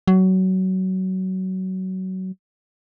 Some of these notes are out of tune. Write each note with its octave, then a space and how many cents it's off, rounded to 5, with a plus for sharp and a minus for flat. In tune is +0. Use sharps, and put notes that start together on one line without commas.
F#3 +20